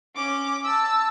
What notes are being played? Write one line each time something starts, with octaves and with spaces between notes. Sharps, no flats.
C#4 D6
A5 E6